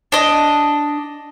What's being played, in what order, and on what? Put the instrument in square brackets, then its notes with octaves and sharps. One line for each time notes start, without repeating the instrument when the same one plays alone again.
[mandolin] D4 D#5